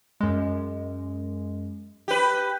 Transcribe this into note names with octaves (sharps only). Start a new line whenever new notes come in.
F#2 G#3
G4 B4